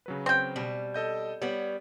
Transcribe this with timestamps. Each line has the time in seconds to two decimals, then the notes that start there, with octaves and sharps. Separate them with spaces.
0.06 C#3 F#3 B4
0.26 C4 G5
0.56 B2 G3
0.94 A4 D#5 G6
1.42 G3 B3 C#5